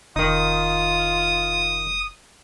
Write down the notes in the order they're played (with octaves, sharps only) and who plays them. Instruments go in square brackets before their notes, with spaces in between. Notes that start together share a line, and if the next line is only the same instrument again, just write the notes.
[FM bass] F1 [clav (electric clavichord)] D#3 D#4 [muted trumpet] F4 [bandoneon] D#6